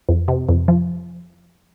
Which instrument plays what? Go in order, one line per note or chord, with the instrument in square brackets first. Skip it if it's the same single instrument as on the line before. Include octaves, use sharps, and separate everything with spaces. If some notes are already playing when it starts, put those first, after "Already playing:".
[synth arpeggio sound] F2
C3
F2
F3